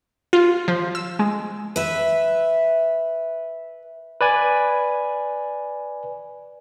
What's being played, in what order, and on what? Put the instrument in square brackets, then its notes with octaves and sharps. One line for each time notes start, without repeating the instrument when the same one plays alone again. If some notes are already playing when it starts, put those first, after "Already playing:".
[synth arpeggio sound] F4
F3
E6
G#3
[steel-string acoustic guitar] B4 E5
[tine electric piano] B4 D5 G#5